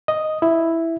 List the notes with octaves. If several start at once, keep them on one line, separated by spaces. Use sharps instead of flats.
D#5
E4